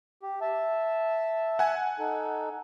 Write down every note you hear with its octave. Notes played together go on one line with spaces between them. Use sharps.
G4
E5 A5
F#5 G#5
D#4 A4